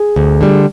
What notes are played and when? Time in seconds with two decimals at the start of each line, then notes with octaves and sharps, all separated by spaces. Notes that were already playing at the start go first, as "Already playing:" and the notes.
Already playing: G#4
0.16 D2
0.41 D3 G3